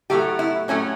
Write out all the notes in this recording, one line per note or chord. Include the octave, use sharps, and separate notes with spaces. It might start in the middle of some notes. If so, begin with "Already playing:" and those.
A2 F#3 A3 G4
E4
A2 F#3 A3 C#4